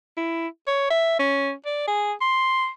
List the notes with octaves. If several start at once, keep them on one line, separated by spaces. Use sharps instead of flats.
E4
C#5
E5
C#4
D5
G#4
C6